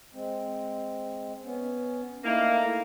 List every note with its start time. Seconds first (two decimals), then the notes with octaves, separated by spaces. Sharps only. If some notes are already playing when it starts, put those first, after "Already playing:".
0.14 G#3 C4
1.44 B3 C#4
2.24 A3 A#3 D#4 E4